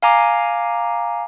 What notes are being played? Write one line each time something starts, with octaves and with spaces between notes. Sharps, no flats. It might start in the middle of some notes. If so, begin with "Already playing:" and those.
F5 G#5 A#5 D6